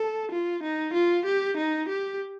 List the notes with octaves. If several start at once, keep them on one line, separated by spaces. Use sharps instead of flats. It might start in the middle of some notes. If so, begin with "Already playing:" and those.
Already playing: A4
F4
D#4
F4
G4
D#4
G4